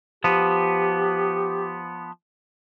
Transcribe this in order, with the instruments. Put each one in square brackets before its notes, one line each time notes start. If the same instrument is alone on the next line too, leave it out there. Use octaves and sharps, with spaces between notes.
[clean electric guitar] F3 B3 [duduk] G4